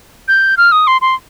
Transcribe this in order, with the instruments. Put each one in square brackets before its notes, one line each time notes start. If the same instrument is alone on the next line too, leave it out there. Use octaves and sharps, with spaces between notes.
[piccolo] G6
F6
D#6
C6
C6